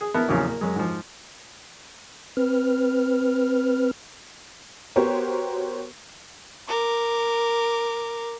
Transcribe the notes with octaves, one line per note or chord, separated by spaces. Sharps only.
G#4
B3 E4 A#4 A5
A1 E2 A#2 C#3 F3 F#3
A#3
F#2 G#3
G#2 F3
C4 B4 F6
B3 F#4 G4 A#4 C5 C#5
A#4 D6